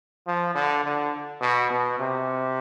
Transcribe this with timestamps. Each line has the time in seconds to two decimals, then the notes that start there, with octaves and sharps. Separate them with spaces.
0.27 F3
0.55 D3
0.84 D3
1.41 B2
1.71 B2
1.99 C3